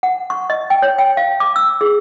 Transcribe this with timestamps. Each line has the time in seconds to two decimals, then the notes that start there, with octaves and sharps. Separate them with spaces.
0.03 F#5
0.30 C#6
0.50 D#5
0.70 G5
0.82 C#5
0.98 G5
1.17 F5
1.40 D6
1.56 E6
1.81 G#4